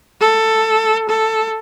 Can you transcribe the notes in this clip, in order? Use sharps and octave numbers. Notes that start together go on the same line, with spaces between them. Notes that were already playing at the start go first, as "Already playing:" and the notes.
A4
A4